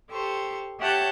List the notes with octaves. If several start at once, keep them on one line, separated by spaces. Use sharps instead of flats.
G4 A4 C5 C#6
G4 C#5 E5 F#5 A5 G6